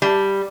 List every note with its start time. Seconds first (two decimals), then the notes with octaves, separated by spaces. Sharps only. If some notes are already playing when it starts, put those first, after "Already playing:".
0.02 G3